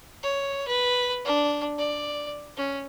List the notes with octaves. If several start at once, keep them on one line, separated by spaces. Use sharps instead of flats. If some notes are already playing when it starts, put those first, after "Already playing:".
C#5
B4
D4
D5
C#4